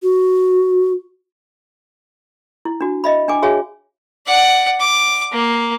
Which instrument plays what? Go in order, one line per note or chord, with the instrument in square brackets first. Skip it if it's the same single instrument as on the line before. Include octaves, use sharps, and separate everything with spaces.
[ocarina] F#4
[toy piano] E4
D4 F#4
D#5 E5 B5
D4 G5 G#5 D6
F#4 G#4 C#5 E5 F5 G#5
[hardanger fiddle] D5 F#5
D6
A#3